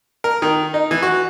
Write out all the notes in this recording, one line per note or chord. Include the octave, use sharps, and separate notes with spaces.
A#4
D#3
D#4
E3
F#4